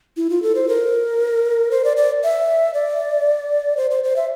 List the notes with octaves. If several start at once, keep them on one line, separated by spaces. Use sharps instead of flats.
E4
F4
A4
C5
A#4
C5
D5
D5
E5
D5
C5
C5
C5
E5